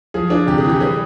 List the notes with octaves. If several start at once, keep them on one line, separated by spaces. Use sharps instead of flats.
F3 G#4
D4 G#4
C3 G4
G#4
E3
G4
G3 G#4